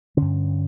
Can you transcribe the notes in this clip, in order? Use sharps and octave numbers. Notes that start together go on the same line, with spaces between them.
G2 D3 C#4